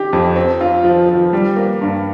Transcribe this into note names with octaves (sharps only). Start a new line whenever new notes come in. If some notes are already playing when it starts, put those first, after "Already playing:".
Already playing: D#4 G4
F2
C4
F4
F3
F3
G3
A#3
G2